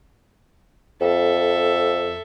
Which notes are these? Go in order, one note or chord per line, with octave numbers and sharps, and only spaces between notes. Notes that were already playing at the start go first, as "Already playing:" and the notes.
F2 A4 E5